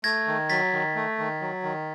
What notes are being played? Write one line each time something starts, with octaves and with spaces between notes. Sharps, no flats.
A3 G#6 A#6
D#3
F#3 A6 B6
D#3
A3
D#3
F#3
D#3